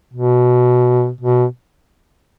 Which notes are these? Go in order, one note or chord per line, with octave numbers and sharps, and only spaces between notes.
B2
B2